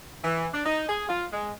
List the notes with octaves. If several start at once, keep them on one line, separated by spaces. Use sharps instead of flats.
E3
D4
D#4
G#4
F4
G#3